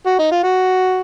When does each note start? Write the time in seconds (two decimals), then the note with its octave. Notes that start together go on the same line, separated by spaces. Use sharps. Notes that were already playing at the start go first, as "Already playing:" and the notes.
0.06 F#4
0.19 D#4
0.31 F4
0.43 F#4